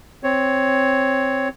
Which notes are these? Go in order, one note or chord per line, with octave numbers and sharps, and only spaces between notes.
C4 C#5